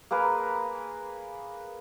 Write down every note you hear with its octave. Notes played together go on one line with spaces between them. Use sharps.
A#3 G#4 A#4 B4